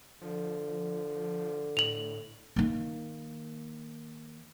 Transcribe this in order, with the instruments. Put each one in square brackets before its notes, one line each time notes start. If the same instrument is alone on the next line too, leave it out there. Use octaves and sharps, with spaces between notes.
[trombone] D3 [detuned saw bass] F3
[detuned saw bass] A2 [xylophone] F7 F#7
[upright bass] D#3 A#3